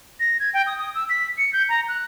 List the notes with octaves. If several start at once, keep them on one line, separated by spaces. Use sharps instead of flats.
A#6
G#6
G5
D#6
D#6
E6
B6
C#7
G6
A#5
F#6